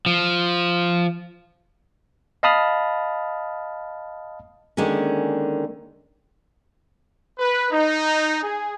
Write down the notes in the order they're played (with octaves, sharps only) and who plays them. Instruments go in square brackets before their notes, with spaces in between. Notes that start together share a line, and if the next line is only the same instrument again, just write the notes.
[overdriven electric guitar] F3
[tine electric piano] D#5 F5 A5 B5 D#6 F6
[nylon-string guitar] D3 D#3 G#3 A#3 C#4
[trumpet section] B4
D#4
G#4